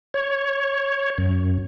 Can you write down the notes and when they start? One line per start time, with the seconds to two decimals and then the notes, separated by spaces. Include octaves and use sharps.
0.14 C#5
1.18 F#2